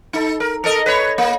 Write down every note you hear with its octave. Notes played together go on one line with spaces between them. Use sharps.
D#4 A4
A#4
A4 A#4 D#5
B4 C#5
A#3